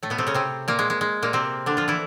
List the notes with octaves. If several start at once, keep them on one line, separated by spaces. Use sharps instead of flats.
A2 A3
B2 B3
C3 C4
C#3 C#4
C3 C4
A#2 A#3
G#3
G#3
G#3
A#2 A#3
C3 C4
D3 D4
F3 F4
E3 E4